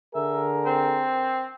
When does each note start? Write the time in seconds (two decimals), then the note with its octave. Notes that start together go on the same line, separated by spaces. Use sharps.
0.15 D3 G#4 A#4 E5
0.66 C4